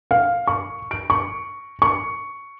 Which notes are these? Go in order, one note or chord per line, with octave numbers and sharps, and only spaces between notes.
F5
C#6
D7
C#6
C#6